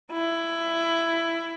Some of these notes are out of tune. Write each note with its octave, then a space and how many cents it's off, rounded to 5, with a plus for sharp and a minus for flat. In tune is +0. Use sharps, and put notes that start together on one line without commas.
E4 +15